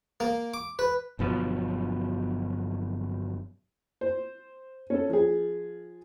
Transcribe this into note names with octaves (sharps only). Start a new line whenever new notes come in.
A#3
D6
B4
G1 B2 F3 F#3
C5
C#4 A4
F3 G#4